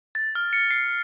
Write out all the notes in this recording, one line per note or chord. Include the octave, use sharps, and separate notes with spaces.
A6
F6
C#7
C7